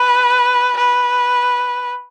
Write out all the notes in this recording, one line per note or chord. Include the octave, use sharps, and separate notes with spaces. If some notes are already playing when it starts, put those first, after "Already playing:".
Already playing: B4
B4